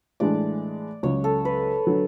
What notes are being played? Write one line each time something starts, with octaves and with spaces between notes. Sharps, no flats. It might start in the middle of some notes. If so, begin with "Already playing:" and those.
A2 E3 G#3 D4 D5
C#2 C#3 F#3 C#5
A4
B4
D3 F#3